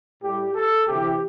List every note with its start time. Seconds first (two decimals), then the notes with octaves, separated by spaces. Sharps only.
0.22 A2 G3 G4
0.54 A4
0.87 D2 C3 E3 G4